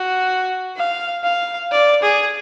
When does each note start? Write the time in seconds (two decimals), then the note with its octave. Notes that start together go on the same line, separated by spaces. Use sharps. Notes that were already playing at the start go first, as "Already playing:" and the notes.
Already playing: F#4
0.77 F5
1.24 F5
1.72 D5
2.02 G#4